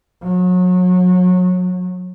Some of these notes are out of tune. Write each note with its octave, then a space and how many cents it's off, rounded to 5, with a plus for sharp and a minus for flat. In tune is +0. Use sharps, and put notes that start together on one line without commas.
F#3 -30